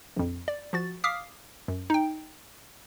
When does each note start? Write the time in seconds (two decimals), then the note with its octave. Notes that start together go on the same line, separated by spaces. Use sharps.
0.17 A#1 F2
0.48 D5
0.73 F3 F#4 A6
1.04 F5 D6 D#6 F6 B6 C7
1.68 F#2
1.90 D#4 G5